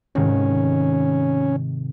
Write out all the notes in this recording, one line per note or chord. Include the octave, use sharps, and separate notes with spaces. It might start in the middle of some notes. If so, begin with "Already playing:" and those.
G#2 C3 D#3 C#4